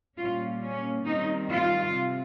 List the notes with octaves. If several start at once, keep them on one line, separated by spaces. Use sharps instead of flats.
A#2 G3 A#3 C#4 F4
C#4
D#3 G3 C4 D#4
F4
C3